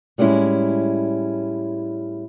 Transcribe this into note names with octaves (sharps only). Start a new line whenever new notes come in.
A2 G3 G#3 C#4 E4